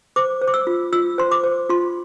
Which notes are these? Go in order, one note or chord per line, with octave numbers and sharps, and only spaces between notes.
C5 D6
C5
D6
E6
F4
F4 E6
C5 C6
D6
C5
F4 C6